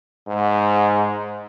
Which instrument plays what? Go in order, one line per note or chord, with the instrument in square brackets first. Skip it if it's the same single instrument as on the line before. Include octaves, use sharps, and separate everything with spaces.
[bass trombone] G#2